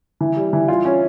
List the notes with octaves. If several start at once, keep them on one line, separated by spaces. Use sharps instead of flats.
E3
G3
E3
F4
C#4